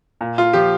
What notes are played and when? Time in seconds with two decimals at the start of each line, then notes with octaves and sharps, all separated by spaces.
0.21 A#2
0.38 F4
0.53 F3 G4